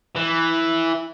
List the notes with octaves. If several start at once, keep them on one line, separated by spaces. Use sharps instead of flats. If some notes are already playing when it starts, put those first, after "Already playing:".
E3